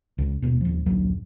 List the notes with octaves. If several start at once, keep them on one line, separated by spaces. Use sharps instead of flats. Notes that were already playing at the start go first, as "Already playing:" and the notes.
C#2
D#1 B2
D#1 F3
D1 A#1 F#2 F#3